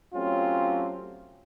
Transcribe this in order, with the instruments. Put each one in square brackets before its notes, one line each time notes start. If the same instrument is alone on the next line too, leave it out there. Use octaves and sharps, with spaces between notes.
[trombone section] F#3 A3 C4 C#4 F4 G4